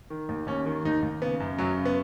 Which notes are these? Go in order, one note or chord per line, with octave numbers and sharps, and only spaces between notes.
D#3
D#2
D#2 C#4
D#3
D#2 D#4
D#2
C#3 B3
F#2
F#2 F#3
C#3
B3